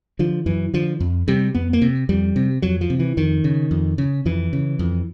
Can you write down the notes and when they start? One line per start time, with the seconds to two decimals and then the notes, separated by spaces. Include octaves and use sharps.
0.19 D3 F3
0.46 F#2 E3
0.74 D3 F3
1.00 F2
1.28 C3 G3
1.55 F2 B3
1.73 A#3
1.82 C3
2.09 F2 G3
2.36 C3
2.62 F2 F#3
2.81 F3
2.90 C3
2.99 E3
3.17 F2 D#3
3.44 C#3
3.71 F2
3.98 C#3
4.25 F2 E3
4.53 C#3
4.79 F2